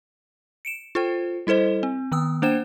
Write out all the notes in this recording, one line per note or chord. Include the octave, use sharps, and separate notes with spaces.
C#7 D7 E7
F4 A4 C5 G5
G3 E4 A4 C5 D#5
C4
D#3 B3 D#6 E6
A#3 D4 C5 F#5 G5 E7